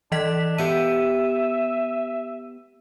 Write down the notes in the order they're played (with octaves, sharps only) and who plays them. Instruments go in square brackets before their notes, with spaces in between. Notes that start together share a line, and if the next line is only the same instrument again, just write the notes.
[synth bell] E3 D#5 B6 [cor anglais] D4
[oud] B3 G4 F5 [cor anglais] E5 [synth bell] D#7